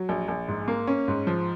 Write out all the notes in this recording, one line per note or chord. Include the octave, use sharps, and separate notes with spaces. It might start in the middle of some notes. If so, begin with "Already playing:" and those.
Already playing: F#3
A#1
A#1
G#2
A#3
C#4
G#2
F3